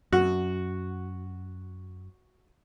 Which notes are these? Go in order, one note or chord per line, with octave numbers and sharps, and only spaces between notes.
F#2 F#4